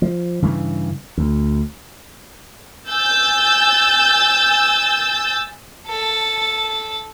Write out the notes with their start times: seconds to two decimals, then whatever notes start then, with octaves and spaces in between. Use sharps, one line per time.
0.02 F3
0.42 G2 C#3 E3
1.17 D2
2.88 G#5 E6 G6 A6
5.88 A4 A5